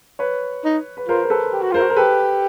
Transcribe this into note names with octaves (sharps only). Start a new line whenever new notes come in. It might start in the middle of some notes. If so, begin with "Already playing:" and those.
B4 C#5
D#4
B4
F4 A#4 C5
A#4
A4 B4
G4
F#4
F4 A#4 C5
F#4
A#4
G4 A4 B4